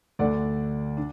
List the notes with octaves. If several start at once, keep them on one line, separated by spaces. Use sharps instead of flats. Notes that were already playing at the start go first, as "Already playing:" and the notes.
D2 D3 A3 D4 D5 F#5
D4